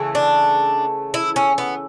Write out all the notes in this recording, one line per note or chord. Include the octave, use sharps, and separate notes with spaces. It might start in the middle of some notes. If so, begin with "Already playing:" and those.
Already playing: C#3 E3 A3
D4
E4
C#4
B3